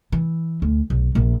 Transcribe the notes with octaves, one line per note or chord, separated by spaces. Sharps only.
E3
D2
B1
A#1